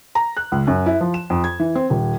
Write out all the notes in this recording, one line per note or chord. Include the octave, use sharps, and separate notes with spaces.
A#5
F#6
C#2
F#2
E4
F3
E7
F2
G#6
E3
C4
D#1